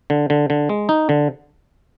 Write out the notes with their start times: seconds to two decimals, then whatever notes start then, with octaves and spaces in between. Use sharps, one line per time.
0.10 D3
0.30 D3
0.50 D3
0.69 G#3
0.89 D#4
1.09 D3